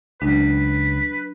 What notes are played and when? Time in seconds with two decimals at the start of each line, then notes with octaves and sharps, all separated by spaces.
0.22 C#2 F#3 D4 B4